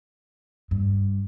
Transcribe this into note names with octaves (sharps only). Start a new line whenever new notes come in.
G2